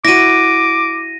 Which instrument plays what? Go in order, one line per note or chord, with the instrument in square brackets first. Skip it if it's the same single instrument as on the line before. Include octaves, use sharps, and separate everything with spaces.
[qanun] E4 F#4 [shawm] D6 [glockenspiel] A#6 D#7